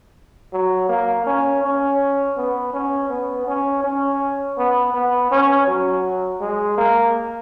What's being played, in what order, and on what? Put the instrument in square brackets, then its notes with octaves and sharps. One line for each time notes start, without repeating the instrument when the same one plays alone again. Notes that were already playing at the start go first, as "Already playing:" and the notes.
[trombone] F#3
A#3
C#4
C#4
B3
C#4
B3
C#4
C#4
B3
B3
C#4
F#3
G#3
A#3